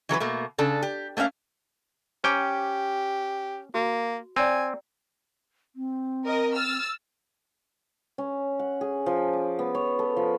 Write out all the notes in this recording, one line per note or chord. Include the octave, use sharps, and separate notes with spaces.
E3 F#3 A#4 B4
B2 A3 A#3
C#3 D4 A4
G4
A3 A#3 C#4 E5 F5
C#4 G4 C5 G5 A#5 D6
A#3 F#4
C4 D5 G5 G#5 A#5
C4
A#4 D#5
E6 F6 A6
C#4
F#5
G#4
F3
D6
B3
C#5
A4
F3